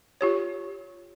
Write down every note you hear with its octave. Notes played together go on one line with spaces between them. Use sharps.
F4 G4 C#5